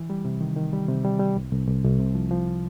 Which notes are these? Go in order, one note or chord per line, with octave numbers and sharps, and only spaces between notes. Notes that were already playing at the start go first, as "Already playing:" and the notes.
Already playing: E3
G3
C3
D#3
D#3
G3
C3
G3
G3
C2
C2
C2
C2
C3
F3
F3